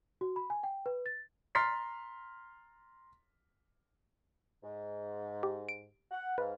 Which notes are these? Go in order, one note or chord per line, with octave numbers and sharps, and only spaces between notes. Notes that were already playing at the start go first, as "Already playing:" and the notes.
F#4
B5
G#5
G5
B4
A6
A#5 C6 F6 A6 B6 C7
G#2
G4
D7
F#5
G#2 B4 F5